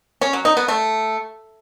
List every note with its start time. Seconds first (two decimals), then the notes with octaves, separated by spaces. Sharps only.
0.21 C#4
0.33 F#3
0.45 D#4
0.57 B3
0.68 A3